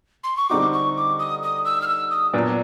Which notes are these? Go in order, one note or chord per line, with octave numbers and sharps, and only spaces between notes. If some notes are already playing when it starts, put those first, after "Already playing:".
C6
C#6
D3 G3 C4 D#4 F#4 D6
C#6
D6
D#6
D#6
E6
F6
E6
D#6
A#2 F#3 B3 D4